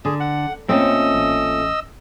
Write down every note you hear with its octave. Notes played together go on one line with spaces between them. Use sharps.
D3 G#4
F#5
A#2 A3 C4 C#4 D#5 E6
A1